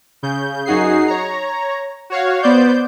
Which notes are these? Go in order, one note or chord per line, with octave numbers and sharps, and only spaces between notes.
C#3 G6
F#2 D#4 F#4 G#4 C7
C#5 A#5
F#4 C#5 F5
B3 C5 D5 G6